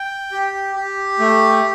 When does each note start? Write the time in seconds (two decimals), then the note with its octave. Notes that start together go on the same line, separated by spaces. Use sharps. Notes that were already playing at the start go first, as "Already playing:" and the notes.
Already playing: G5
0.32 G4
0.76 G4
1.19 A3